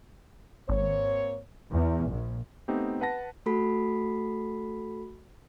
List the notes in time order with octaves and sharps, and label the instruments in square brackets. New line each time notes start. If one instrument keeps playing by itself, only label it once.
[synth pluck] G#1 [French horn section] A#3 C4 C#5
[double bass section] E2
A#1
[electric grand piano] A3 B3 C4 D#4 G4
B4 F#5 A5 A#6
[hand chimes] A3 F#4 A4 B5 B6 C7